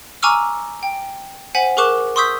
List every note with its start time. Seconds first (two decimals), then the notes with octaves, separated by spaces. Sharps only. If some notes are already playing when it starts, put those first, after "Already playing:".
0.23 G#5 A#5 C#6 D6 E6 F6
0.83 G5
1.55 C5 F#5 G#5 B6 F#7
1.77 G#4 A#4 C#6 D6 F#6 E7
2.16 C6 C#6 D#6 E6 G6 B6